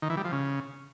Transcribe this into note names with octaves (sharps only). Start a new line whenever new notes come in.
D#3
E3
G3
F3
C#3